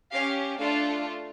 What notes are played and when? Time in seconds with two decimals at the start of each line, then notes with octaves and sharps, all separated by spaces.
0.11 C#4 G4 F5
0.58 A3 D4 F4 A4 F5